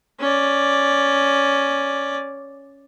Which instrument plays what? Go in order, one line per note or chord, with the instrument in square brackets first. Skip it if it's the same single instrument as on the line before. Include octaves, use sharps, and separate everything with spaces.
[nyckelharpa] C#4 D5